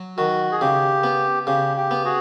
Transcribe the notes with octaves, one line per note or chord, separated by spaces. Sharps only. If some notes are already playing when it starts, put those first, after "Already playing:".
Already playing: F#3
D#3 F#4
G#4
C#3 G4
B3
C#3 G4
G4
B3
F#4 G#4